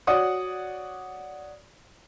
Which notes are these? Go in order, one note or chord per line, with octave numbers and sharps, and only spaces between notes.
F#4 C#5 D5 F#5 D#6